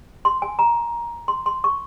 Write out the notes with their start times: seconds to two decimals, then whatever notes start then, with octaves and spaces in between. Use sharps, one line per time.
0.25 C6
0.42 G#5
0.59 A#5
1.28 C6
1.46 C6
1.64 C#6